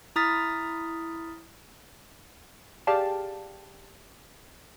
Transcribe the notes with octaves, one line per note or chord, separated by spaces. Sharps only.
E4 A#5 D#6 F6 A6 B6
G4 G#4 D5 F5 G5 A5